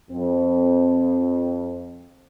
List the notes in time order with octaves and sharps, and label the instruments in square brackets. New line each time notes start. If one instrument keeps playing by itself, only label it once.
[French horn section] F2 C4